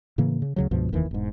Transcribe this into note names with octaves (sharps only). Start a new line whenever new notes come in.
A2 C#3 E3 A#3
C#3
D2 C#3 F#3
C#2 G2 B2 F3
F1 D#2 D#3 E3
E1 G#2